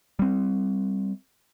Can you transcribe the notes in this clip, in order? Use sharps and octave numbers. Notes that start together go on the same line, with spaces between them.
G3 C4